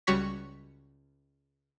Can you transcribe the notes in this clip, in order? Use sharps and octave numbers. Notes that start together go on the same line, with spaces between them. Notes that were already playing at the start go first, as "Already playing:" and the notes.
C#2 G3 F#4 C#5 C#6 B6